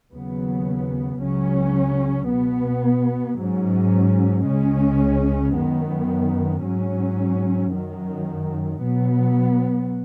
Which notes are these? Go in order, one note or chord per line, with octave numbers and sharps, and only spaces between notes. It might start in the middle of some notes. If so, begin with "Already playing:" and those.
D#2 C#3 F#3 B3
C#2 C#3 F#3 C#4
B2 B3
G#2 F#3 C#4
C#2 C#3 G#3 C#4
F#2 D#3 B3
G#2 F#3 C#4
F#2 D#3 F#3
B2 F#3 B3